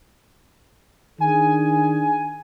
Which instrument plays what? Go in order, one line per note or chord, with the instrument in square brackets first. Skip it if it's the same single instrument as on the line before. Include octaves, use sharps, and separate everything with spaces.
[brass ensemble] D#3 D4 G#4 [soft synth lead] G#5